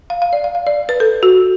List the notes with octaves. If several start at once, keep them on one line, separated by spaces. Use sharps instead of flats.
F5
F5
D5
F5
F5
D5
B4
A4
F#4